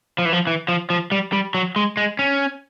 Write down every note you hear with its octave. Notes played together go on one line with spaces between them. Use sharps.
F3
E3
F3
E3
F3
F3
G3
G3
F#3
G#3
G#3
C#4